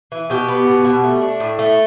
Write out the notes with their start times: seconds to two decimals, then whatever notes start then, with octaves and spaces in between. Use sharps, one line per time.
0.12 E3
0.30 B2 G4
0.49 B3
0.67 B2
0.85 B2
1.04 A3
1.22 D4
1.40 A2
1.59 A3